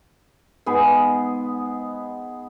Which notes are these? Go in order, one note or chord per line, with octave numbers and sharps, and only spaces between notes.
G#2 B3 G#4 B4